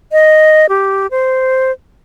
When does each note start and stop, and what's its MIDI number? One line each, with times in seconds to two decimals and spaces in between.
0.12 0.66 75
0.69 1.07 67
1.11 1.72 72